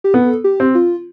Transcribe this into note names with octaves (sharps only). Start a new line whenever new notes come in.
G4
B3 A4
G4
C4
F4